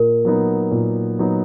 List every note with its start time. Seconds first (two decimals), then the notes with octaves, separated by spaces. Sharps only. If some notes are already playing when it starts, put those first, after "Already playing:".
Already playing: A#2 A#4
0.25 F#3 B3 D#4
0.71 A#2
1.19 F#3 B3 D#4